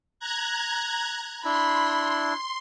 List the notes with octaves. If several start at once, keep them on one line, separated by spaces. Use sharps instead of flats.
A#5 F#6 G#6
D4 E4 B5 C6